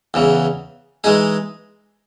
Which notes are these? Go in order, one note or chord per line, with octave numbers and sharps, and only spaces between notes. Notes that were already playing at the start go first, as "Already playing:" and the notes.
E2 C#3 E3
E3 G#3 D#4 G#4